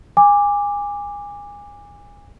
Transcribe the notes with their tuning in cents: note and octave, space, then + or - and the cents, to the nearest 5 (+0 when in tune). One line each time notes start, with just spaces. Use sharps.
G#5 -25 D6 +0